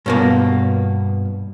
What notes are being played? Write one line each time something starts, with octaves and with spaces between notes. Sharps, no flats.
G2 B2 A#3